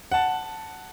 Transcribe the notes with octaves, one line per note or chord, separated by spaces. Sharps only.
F#5 A5